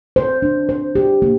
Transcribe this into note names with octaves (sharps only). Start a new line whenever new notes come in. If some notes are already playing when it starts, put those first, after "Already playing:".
C5
D4
C5
G4
A#3